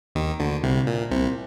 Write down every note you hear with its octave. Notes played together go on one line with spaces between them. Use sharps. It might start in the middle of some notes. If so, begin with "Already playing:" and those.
D#2 D#3
D2 D3
C2 C3
A#2
C2 C3